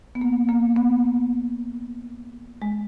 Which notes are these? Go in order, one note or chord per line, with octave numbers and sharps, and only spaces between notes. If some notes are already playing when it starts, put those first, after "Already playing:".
B3
A#3
A#3
B3
G#3